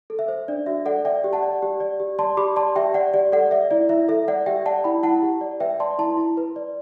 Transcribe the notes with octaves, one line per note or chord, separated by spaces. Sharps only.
A4
E5
C5
D4 D5
F#4 E5
A4 D5 F#5
D5 E5 G5
G4
F#5 A5
D5
G4
D5
G4
D5 A5 C6
G4 B5 D6
D5 A5 C6
G4 E5 G5
D5 F#5
G4 D5
A4 D5 F#5
D5 E5
E4 D5
E4 E5
A4 E5
D5 F#5
G4 E5 G5
D5 F#5 A5
E4 G5 B5
E4 F#5 A5
G4
D5
B4 E5 G5
D5 A5 C6
E4 A5 C6
E4
B4
D5